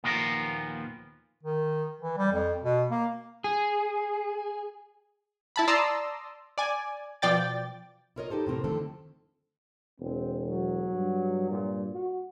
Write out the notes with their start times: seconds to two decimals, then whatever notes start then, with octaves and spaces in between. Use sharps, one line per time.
0.04 D#2 A#2 F3 B3 F4 A#4
1.43 D#3
2.01 E3
2.17 G3
2.32 F2
2.64 B2
2.90 A#3
3.44 G#4
5.56 E4 A5 B5
5.68 D5 A5 A#5 C6 D#6 E6
6.58 D5 G#5
7.22 B2 F3 D5 G5 A6
8.16 E4 F4 A#4 C#5 D#5
8.30 D#4 G4 A4 C5
8.47 A2 C3 C4 A#4 C5
8.64 D3 D#3 F3 A3 C4 A4
10.00 E1 C4
10.47 F#3
10.93 G2
11.51 A#2
11.93 F#4